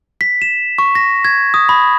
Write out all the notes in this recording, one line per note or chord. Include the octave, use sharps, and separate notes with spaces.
B6
E7
C#6
A#6
G#6
D#6
B5